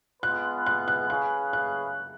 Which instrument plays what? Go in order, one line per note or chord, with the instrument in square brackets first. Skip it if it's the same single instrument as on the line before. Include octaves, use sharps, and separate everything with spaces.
[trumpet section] G#3 B3 F4 B4 [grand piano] F#6
[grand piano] F#6
F#6
[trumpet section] C#4 G#4 B4 F5 [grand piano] F#6
[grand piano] F#6